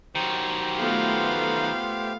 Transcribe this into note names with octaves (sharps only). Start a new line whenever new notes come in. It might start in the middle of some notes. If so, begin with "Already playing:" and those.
D#3 F#3 G4 C5 G5
A3 B3 F4 F5